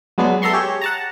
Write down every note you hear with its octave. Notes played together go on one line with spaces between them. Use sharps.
F#3 G#3 B3 D4 G#4
A4 E5 A#5 C6 C#6
G4 G#4 C#5
F#5 A5 A#5